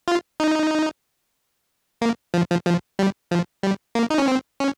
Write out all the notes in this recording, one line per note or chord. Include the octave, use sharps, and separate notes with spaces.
F4
D#4
A#3
F3
F3
F3
G3
F3
G3
A#3
D#4
C#4
C4
C#4